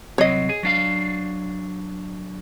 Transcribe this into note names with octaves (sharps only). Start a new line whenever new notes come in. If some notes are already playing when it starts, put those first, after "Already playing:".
C2 F#3 C4 C#5 D#5
G#4
F#3 D4 F5